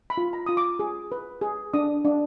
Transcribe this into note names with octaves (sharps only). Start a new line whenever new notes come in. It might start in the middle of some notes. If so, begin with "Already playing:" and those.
B5
F4
A#5
F4 D#6
D6
G#4
B4
G#4
D4 D#6
D4